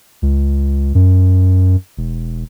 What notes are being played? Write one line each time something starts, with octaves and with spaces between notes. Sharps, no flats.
C#2
F#2
E1